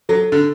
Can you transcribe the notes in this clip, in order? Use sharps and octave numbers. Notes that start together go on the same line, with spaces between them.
F#3 A4
D3